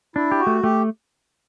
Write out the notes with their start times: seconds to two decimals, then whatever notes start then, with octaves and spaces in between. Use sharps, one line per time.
0.16 D4 E4
0.31 G4
0.39 F#4
0.47 A3
0.63 A3 G4